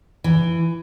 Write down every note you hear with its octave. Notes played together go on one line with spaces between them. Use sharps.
E3